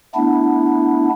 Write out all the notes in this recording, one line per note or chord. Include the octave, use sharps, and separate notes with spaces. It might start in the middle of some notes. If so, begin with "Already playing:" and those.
A3 B3 D4 E4